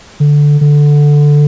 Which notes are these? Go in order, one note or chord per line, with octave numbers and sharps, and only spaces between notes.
D3
D3